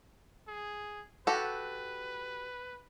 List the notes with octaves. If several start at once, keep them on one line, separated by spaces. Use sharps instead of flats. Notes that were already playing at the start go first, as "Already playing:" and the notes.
G#4
F#4 G4 A4 B4